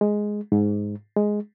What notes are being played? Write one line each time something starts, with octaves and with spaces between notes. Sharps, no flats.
G#3
G#2
G#3